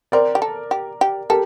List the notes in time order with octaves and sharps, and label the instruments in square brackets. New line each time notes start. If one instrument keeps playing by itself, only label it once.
[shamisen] C4 [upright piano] A#4 D5
[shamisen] G4
A4
G4
G4
[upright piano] G4 A#4 [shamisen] A4